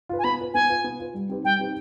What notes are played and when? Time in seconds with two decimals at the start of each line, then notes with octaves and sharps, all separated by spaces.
0.09 F4 B4
0.19 G#5
0.24 B3 B5
0.39 F4 B4
0.54 B3 G#5
0.69 F4 B4
0.84 B3
0.99 F4 B4
1.14 G3
1.29 C4 D#4 G4 B4
1.44 G3 G5
1.59 C4 D#4 G4 B4